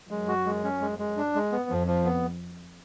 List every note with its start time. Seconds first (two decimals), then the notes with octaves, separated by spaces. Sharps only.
0.10 F#2 G#3
0.28 F#4
0.46 G#3
0.64 C#4
0.81 G#3
0.99 G#3
1.17 D4
1.35 G#3
1.52 B3
1.70 F2 F3
1.87 F3
2.05 B3